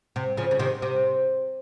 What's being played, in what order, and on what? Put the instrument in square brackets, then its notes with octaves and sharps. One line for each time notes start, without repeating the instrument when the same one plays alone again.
[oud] C3
C#3 F3
C#3
C3 D#3
C3